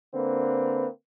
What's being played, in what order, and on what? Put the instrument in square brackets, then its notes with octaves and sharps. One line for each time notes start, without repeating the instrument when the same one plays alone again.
[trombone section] D3 A#3 C4 B4